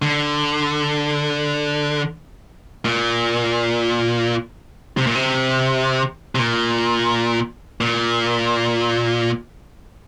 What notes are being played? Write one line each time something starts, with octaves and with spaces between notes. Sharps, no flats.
D3
A#2
C3
A#2
C3
C3
A#2
A#2